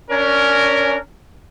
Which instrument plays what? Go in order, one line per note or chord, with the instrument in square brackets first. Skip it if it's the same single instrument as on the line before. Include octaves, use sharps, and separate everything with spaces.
[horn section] C#4 D4 A#4